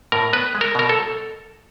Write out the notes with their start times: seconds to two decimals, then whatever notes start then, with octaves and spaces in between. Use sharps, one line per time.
0.12 A2 A#4
0.33 B3 B4
0.55 G#3
0.61 A#4
0.75 B2 A#4
0.89 A4